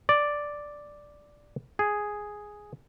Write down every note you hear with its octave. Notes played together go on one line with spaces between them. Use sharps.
D5
G#4